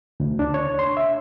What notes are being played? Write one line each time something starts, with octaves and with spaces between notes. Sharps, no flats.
D2
D4
C#5
C6
E5